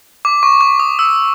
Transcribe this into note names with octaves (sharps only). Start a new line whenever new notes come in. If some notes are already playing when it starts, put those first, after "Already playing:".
D6
C#6
D6
D#6
E6